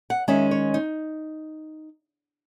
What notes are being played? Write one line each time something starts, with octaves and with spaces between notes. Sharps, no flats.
F#5
D#3 G#3 C#4 E5
C#5
D#4